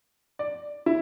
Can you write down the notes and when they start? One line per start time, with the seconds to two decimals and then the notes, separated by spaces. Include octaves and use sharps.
0.39 D5
0.86 E4